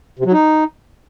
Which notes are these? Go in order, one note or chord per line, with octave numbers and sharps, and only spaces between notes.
C3
F#3
D#4